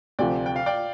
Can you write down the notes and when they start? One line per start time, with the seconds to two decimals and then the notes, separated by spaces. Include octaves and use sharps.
0.19 D2 C3 F3 D5 G5
0.46 G5
0.56 F5
0.66 D5 G5